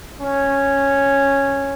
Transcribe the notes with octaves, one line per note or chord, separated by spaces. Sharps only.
C#4